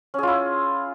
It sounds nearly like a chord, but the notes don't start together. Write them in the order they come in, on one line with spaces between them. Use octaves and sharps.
C#4 G#4 F4 E4